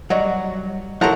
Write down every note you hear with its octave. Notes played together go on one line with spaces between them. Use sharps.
F#3 G3 D5 D#5 F#5
F3 F#3 E4 A4 A#4 F#5 A5 A#5